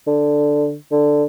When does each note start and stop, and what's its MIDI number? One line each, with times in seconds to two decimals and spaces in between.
0.07 0.75 50
0.91 1.24 50